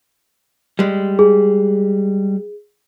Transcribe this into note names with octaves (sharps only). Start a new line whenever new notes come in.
G3 G#3
G#4